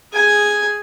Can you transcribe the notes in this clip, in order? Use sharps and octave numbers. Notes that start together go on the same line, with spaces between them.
G#4 G#5